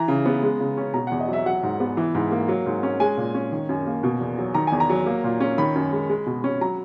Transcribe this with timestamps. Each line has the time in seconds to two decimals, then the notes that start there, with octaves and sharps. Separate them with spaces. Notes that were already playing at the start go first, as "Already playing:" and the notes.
Already playing: E3 A#5
0.08 C#3
0.26 B3
0.42 G#3
0.60 C#3
0.77 C#4
0.94 B2 A#5
1.07 E2 F#5
1.20 D#5
1.28 F#3
1.33 E5
1.45 F#3 F#5
1.63 G#2
1.80 B3
1.97 E3
2.15 G#2
2.31 A#3
2.48 F#3
2.66 G#2
2.83 C#4
3.00 G#3 G#5
3.17 A#2
3.34 C#4
3.52 D#3
3.69 F#2
3.87 A#3
4.03 B2
4.20 E2
4.38 F#3
4.54 D#3 A#5
4.67 E2 G#5
4.80 A#5
4.89 F#3
5.06 A#3
5.24 A#2
5.40 C#4
5.58 D#3 B5
5.75 F#2
5.92 G#3
6.09 G#3
6.26 B2
6.44 C#4
6.61 F#3 A#5